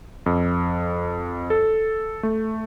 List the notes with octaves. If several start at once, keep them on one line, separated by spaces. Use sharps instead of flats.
F2
A4
A3